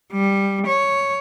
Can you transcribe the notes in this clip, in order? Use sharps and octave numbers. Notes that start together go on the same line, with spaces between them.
G3
C#5